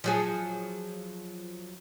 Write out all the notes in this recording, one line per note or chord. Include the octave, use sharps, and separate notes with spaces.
F3 F#3 G#4